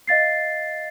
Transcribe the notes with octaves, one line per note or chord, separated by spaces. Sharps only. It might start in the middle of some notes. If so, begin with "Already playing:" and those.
D#5 F5 A6 C7